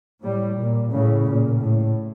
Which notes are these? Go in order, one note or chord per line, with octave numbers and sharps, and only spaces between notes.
A2 G3
A#2
A2 C#3
A#2
A2